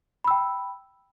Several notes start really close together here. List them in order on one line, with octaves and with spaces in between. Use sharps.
B5 E6 G5